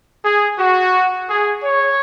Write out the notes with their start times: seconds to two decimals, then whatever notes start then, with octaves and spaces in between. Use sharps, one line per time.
0.24 G#4
0.58 F#4
1.28 G#4
1.62 C#5